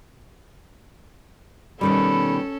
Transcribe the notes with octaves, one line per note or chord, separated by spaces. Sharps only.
B2 D#3 G3 C#4 A4 B5